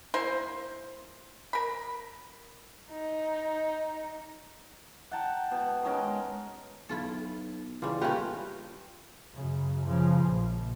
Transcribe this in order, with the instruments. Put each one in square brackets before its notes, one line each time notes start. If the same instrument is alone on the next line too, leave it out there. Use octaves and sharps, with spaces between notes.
[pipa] A#3 E4 C5
A#4 B5
[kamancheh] D#4
[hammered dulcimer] F#5 G5 A5 A#5
B2 A5
D#3 G#3 C#4 A#4
[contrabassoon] B1 [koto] E4 F4 A4
[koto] C#3 G3 [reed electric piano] E3 F4
[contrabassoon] A#2 [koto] A3 C#4 D#4 [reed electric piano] F4 B4 [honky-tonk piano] G4
[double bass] F#2 C#3
C#3 F3
A#1